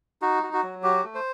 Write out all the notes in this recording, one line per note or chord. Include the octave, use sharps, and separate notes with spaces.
D#4 F#4
F#4
F#4
F#3
F#4 G4
A3
C5